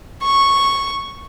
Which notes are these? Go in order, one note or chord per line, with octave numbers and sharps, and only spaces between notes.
C#6